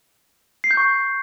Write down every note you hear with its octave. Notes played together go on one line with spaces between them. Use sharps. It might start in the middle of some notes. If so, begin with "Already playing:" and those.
C7
G6
C#6